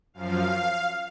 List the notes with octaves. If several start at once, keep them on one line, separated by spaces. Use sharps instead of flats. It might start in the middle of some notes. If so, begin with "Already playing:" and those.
F#2 F3 F5